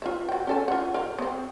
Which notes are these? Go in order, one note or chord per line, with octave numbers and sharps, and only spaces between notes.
F4 B4 E5
F#4 G5
C#4 A4 G#5
F4 F#5
A#4 C5 F5
B3 C4